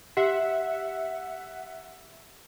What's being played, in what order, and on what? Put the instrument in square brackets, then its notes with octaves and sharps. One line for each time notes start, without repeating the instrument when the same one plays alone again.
[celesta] G4 [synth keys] E5 F#5